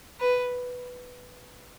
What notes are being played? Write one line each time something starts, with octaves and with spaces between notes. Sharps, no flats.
B4